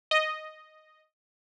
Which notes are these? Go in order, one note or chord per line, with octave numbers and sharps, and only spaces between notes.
D#5